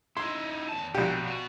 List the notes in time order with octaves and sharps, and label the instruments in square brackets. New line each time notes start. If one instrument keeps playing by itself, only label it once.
[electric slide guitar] D#4 E4 [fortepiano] C6
[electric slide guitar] E2 A5
[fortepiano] A#1 G4 [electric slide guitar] B2
[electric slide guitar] B2 F#4